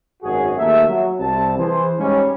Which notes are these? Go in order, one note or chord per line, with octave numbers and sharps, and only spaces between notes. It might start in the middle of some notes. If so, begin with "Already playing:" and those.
G#1 F#2 F#4 G#4
D#2 A3 A#3 G#4 A#4 E5
F#3
C2 C4 A5
E3 G#4 C5
G#2 G3 G#3 C#4